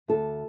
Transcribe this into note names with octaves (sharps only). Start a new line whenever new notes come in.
D2 A4